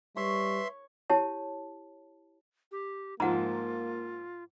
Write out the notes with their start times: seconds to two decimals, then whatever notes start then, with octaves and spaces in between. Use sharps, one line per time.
0.16 G3 B4 C#5 E5 C6
1.10 E4 G4 C#5 A5
2.72 G4
3.20 G#2 F3 A#3 F4 F#5 A#5